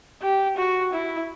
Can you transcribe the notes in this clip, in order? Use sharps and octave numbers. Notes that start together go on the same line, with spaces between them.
G4
F#4
E4